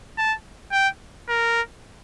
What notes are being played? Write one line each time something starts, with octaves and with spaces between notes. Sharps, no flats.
A5
G5
A#4